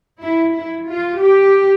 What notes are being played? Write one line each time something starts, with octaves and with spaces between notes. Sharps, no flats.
E4
E4
F4
G4